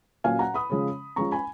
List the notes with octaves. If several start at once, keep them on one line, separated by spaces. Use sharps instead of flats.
A#2 F#3 C#4 F5 G#5
F#5 A#5
B5 D#6
C#3 F3 G#3 C#4
F3 G#3 C#4 A#5 C#6
G#5 B5